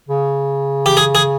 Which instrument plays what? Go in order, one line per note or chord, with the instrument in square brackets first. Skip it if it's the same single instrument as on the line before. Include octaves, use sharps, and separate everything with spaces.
[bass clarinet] C#3
[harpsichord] G4
G#4
G#4